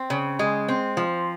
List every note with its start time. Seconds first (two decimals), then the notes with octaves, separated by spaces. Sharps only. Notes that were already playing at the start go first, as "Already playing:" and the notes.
Already playing: C4
0.10 C#3
0.39 G#3
0.68 C4
0.97 F3